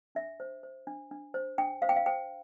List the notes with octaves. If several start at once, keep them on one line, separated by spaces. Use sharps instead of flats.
D4 E5
C5
C5
D4
D4
C5
D4 G5
C5 F5
G5
F5
C5 G5